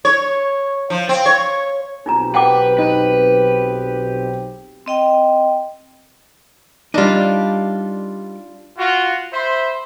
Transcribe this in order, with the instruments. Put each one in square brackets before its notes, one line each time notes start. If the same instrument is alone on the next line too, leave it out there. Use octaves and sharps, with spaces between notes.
[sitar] C#5
F3
C4
C#5
[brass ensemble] B1 C4 G4 [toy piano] D#4 F4 A#5
[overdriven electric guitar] B4 [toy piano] F#5 G5 D6
[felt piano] D#4 [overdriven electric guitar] B4
[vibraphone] C4 D#5 G5
[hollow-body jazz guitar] G3 D#4 [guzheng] D4 F4
[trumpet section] F4 F#4
C5 E5 B5 C6